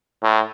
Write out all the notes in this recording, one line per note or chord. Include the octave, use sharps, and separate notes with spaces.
A2